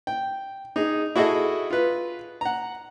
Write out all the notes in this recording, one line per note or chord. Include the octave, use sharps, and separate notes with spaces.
G5
D#4 G#4
E4 F#4 G#4 A4 D#5
F4 B4
F#5 A#5